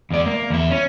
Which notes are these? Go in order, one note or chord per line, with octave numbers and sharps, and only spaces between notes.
E2 D5
A#3
E2 E4
C#4